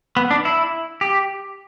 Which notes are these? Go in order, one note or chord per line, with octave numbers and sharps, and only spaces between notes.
B3
D4
E4
G4